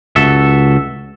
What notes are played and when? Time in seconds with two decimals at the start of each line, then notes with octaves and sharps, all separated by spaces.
0.16 C#2 F#4 A4 E5